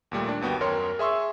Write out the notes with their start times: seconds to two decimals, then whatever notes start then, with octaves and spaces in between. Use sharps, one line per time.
0.11 D#2 A#2 G3 A3
0.28 D4
0.41 G1 D#2 B3 F#4 G5
0.61 F#2 A#4 C#5 C6
0.99 G#4 E5 C6 C#6 E6